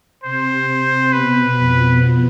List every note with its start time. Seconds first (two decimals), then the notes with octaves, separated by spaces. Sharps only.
0.24 C3 C4 C5
1.12 B2 B3 B4
1.58 F2 F3